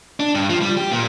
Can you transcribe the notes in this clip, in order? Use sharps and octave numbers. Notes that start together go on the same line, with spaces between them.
D4
G2
F3
G3
G4
A#2